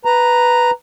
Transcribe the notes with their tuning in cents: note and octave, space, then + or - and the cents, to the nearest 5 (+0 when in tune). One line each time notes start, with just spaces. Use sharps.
B4 +0 A#5 +0